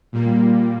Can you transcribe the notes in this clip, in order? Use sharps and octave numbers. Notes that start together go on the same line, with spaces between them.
A#2 G3 A#3